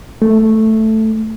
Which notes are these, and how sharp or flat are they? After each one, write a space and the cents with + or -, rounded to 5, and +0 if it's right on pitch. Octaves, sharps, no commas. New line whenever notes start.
A3 +0